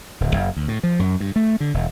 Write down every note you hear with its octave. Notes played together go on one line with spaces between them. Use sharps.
D1
F#1
D2
A2
F3
F#2
G2
A3
D3
E1